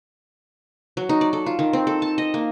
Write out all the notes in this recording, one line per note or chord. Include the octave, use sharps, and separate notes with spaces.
F#3
D#4
D5
A4
F4
D#3
C4
A4
A5
D#5
A#3